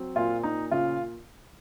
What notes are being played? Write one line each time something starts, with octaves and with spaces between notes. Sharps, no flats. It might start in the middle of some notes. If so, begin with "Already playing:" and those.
Already playing: F#3 C4
A#2 F4
A#2 D#4
C#3 F4